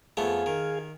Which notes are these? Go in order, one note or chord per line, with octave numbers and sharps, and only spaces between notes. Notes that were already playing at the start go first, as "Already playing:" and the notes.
F2 A3 B3 G#4 F5 G#5
D#3